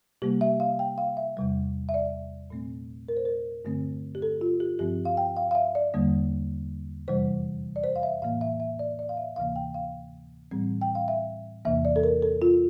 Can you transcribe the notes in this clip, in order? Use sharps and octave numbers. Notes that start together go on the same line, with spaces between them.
C3 G3 A#3 G4
E5
F5
G5
F5
E5
E2 C3 G3
E5
D5
A#2 A3 C4
A#4
C5
A#4
G2 D3 A3 C4
G4
A4
F4
G4
G2 F3 C4 G4
F5
G5
F5
F5
E5
D5
E2 D3 G3 A#3
F2 C3 E3 G3 C5
D5
C5
F5
E5
A2 E3 A#3 F5
E5
E5
D5
D5
F5
E5
D2 C3 E3 A#3 F5
G5
F5
A2 E3 G3 C4
G5
F5
E5
E2 C3 E3 A#3 E5
D5
A4
A#4
A4
F4